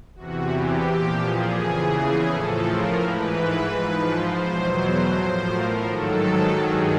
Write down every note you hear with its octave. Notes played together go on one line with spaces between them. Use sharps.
E2 C3 E3 F#4
G4
A#2 F3
G#4
E2 C#3 E3
A2 F3 A4
A#4
G#2 E3 B4
G#2 F3
C5
E2 B2 F#3
A2 F3
A#4
G#2 D#3 F#3 A4
G2 D#3 F#3 G#4